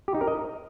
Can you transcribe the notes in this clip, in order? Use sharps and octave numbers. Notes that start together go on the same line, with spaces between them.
G4
D#4
A#4
D#5